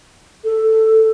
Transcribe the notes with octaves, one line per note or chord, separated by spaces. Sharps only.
A4